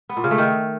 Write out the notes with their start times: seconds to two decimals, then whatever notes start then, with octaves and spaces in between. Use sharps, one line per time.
0.09 B3
0.17 A#2
0.24 C#3
0.31 A3
0.38 D#3